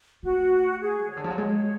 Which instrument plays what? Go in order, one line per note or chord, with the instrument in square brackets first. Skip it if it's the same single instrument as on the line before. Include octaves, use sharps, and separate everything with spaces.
[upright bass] A3 [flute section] F#4
[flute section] G#4
[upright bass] C#3 [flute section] C#5
[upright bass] D3
F3
F#3
G#3